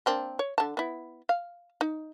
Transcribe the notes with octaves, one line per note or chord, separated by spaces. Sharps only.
A#3 C4 D4
C#5
D3 A5
B3 E4
F5
D#4